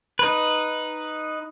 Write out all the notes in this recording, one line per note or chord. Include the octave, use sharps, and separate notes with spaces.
D#4 B4